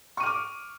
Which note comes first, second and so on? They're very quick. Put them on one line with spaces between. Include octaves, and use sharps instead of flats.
C#6 D#7 F6 D6